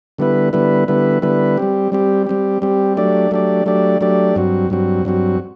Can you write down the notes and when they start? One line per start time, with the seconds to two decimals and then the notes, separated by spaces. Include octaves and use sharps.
0.18 D3 G3 B3 E4 B4
0.53 D3 G3 B3 E4 B4
0.88 D3 G3 B3 E4 B4
1.22 D3 G3 B3 E4 B4
1.57 G3 C4 G4
1.92 G3 C4 G4
2.27 G3 C4 G4
2.62 G3 C4 G4
2.97 F#3 A3 D4 G4 D5
3.31 F#3 A3 D4 G4 D5
3.66 F#3 A3 D4 G4 D5
4.01 F#3 A3 D4 G4 D5
4.36 G2 F#3 C4 F#4
4.70 G2 F#3 C4 F#4
5.05 G2 F#3 C4 F#4